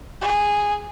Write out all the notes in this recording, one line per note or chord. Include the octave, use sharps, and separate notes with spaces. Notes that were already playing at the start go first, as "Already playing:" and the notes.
G#4